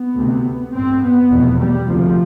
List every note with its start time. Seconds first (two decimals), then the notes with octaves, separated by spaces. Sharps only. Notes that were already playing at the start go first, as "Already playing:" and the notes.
Already playing: B3
0.15 D2 C3
0.73 A1 G2 C4
1.01 B3
1.30 F1 E2 B2
1.59 G3
1.87 D2 C3 F3